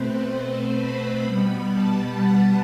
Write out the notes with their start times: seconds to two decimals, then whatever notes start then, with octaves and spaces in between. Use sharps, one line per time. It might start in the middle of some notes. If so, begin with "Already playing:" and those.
Already playing: B2 A3 C4 B4 C5
0.29 C5
0.76 B5
1.24 B2 G3 B3
1.71 A5
2.18 F#5